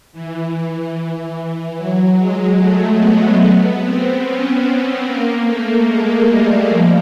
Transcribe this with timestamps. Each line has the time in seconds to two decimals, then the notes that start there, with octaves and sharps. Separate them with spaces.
0.13 E3
1.77 F#3
2.18 G#3
2.58 A3
3.00 B3
3.41 B3
3.82 C4
4.23 C#4
4.64 C4
5.05 A#3
5.46 A3
5.88 G#3
6.28 G3
6.69 F3